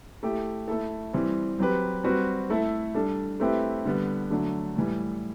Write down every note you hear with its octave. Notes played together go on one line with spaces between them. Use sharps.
A3 E4 G4
A3 E4 A4
E3 G3 C4
F#3 C4 G4 B4
G3 C4 F#4 B4
A3 E4 A4
G3 D4 A4
A3 C4 E4 G4 B4
D3 G3 B3
D3 F#3 A3 D4
A2 E3 G3